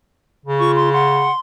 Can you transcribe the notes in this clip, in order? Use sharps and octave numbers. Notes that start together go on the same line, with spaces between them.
C#3
F4 C#6
C6
F#5 C6